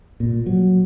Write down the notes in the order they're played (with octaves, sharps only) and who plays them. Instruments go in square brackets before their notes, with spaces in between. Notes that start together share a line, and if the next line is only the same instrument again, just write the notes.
[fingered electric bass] A#2
F#3